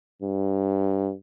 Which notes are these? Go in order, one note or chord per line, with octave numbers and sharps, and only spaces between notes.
G2